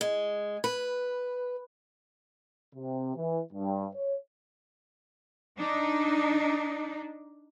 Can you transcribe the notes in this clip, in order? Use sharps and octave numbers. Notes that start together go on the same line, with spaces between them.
G#3
B4
C3
E3
G2
C#5
D4 D#4